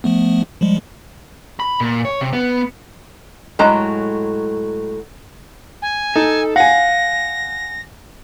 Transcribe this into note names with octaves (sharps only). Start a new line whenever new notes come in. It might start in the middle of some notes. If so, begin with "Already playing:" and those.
F3 A3 B3
F3 G3 G#3
B5
A#2
C#5
C3
B3
A2 F#3 G#3 A#5
G#5
D#4 A4
F5 F#5 G#5 A#6